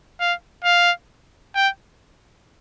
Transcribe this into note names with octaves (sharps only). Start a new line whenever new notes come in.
F5
F5
G5